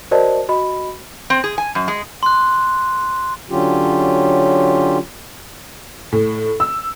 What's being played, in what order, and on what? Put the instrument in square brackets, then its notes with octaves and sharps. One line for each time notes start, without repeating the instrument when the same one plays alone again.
[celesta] F#4 A#4 C5 D5 D#5 A5
F#4 D#5 B5
[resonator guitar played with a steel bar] C4
G#4
G#5
F#2
G#3
[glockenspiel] C6 F#6
[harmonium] D3 F#3 C#4 F4 G4
[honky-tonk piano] A2
E6